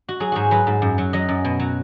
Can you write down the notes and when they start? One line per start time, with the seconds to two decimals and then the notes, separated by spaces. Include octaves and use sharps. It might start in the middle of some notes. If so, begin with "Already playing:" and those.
0.09 F#4
0.20 F#3 G#4
0.32 G#2 F#4 G#4
0.51 F#3 B4
0.67 G#2
0.82 F#2
0.98 F#3
1.13 F#3 D#5
1.28 F#2
1.45 B2
1.60 F#3